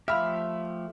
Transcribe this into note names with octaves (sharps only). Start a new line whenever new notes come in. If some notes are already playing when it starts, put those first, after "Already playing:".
F3 A3 G4 E5 F5 B5 F6